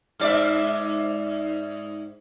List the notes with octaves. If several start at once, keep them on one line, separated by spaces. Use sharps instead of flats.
G#2 D5 E5